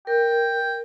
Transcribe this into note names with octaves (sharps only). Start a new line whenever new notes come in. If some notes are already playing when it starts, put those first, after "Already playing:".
A#4 G5